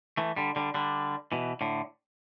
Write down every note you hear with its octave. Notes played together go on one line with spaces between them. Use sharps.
E3 A3
D3 G3
D3 G3
D3 G3
B2 E3
A2 D3